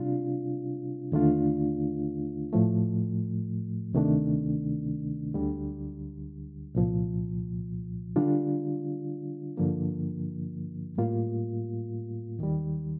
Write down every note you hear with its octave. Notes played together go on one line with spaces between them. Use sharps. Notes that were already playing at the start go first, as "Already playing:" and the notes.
Already playing: C3 G3 D4 F4
D#2 D3 A3 D4 F4
A2 F3 A3
D2 C3 D#3 A3 D4
D2 D3 G3
C2 A#2 F3
D3 G3 D4 F4
G2 D3 F3 A#3
A2 G3 A#3 F4
D#2 D#3 G3